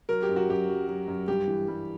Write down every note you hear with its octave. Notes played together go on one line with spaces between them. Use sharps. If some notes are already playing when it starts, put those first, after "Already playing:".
F#3 A#4
G4
F#2
F#4
F#2 G4
F#3
F#3
F#2
G2 G4
E3
G3